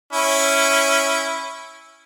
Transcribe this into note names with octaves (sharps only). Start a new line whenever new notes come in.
C#4 E4